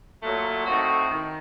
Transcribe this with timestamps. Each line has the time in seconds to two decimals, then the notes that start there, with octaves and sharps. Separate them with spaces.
0.23 A#2 F#3 A3
0.66 A2 A3 C4 D#4 F#4
1.10 D#3